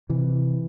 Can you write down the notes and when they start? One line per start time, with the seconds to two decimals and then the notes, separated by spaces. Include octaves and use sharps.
0.09 C3 E3